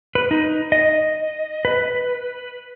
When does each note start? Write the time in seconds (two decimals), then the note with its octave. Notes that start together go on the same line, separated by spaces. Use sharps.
0.15 B4
0.31 D#4
0.72 D#5
1.65 B4